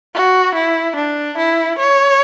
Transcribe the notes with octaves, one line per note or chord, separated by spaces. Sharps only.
F#4
E4
D4
E4
C#5